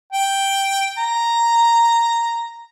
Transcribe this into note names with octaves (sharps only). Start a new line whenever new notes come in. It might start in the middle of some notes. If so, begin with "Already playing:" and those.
G5
A#5